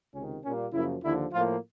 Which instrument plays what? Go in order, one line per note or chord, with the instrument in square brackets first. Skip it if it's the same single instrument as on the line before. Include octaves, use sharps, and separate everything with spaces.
[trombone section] C#2 C3 D#3 C#4
A#2 G3 A#3 C#4
F#2 C#3 F3 A#3 E4
D#2 D3 F3 E4
A2 F3 A#3 F4